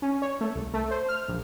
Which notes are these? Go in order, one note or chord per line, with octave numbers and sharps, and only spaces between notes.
C#4
C#5
A3
C2
A3
C5
F6
A#1